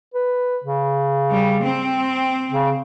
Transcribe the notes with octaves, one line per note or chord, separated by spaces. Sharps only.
B4
C#3
G3
C4
C#3